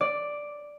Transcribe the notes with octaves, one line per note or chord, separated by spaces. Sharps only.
D5